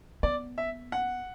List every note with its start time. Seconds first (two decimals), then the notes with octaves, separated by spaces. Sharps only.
0.23 B3 D5
0.58 E5
0.92 F#5